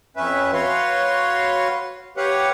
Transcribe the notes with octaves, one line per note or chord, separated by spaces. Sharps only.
F2 C#4 B4 E5
F#4 B4 C#5 F5 C6
G4 B4 C#5 F5 F#5